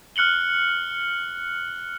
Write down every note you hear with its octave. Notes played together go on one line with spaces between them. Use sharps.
F6 F#6 C#7 F#7 G7